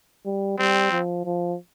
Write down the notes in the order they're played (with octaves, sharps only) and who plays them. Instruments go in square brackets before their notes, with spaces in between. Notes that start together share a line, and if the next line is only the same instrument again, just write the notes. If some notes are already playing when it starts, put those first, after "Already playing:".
[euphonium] G3
[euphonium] G3 [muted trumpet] C4
[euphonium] F3
F3